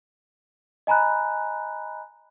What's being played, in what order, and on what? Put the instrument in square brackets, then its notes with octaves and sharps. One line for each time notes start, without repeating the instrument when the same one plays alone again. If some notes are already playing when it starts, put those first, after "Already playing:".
[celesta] D#5 G#5 A#5 B5 F#6